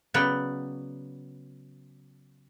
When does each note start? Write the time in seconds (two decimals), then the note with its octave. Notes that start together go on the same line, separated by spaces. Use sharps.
0.14 C#3 F#3 B3 C#5 D5 G5